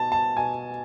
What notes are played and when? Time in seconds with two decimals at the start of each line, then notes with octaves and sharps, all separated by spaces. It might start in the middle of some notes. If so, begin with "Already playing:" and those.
Already playing: B2 A5
0.12 A5
0.36 B2 G#5